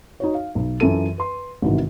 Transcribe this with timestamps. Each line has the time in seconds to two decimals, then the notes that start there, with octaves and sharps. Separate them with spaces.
0.20 D#4 F#4 C#5
0.34 F5
0.55 B1
0.80 F#2 E3 F4 A4 D#7
1.18 B4 C6
1.62 A1 G#2 C3 D#3 E3 F#4